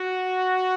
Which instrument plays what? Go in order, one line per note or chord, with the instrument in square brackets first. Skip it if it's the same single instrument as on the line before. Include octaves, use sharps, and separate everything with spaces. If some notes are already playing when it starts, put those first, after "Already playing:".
Already playing: [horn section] F#4